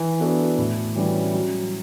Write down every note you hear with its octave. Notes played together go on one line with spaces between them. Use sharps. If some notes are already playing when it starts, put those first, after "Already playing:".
Already playing: E3
B3 D4 F#4 A4
A2
E3 G3 C#4 F#4
F#3